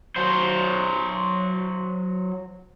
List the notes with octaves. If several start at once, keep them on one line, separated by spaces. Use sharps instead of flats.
F#3 C5